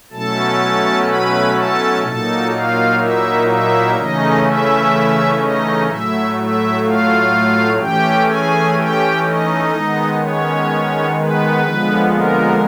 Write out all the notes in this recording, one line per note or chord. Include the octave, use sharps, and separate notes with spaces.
B2 F#3 A3 C#4 E4 A4 A5
B4 B5
A4 A5
A#2 F#3 A#3 D#4 A4 A5
F4 F5
E4 E5
E4 E5
C#3 E3 A3 C#4 D#4 D#5
E4 E5
D#4 D#5
A2 F#3 A3 E4 E5
E4 E5
F4 F5
E3 A3 C#4 G4 G5
G#4 G#5
G4 G5
D#4 D#5
D#3 G#3 B3
C#4 C#5
B3 B4
D3 F3 G#3 B3
A#3 A#4